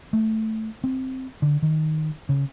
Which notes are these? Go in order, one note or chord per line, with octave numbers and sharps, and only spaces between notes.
A3
C4
D3
D#3
C#3